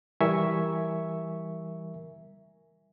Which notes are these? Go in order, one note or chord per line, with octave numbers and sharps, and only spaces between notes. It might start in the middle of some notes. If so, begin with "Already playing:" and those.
E3 G3 A#4 E5 G#5 C#6